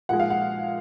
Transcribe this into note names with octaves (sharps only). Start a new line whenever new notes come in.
A#2 F3 G#3 F#5
F5
F#5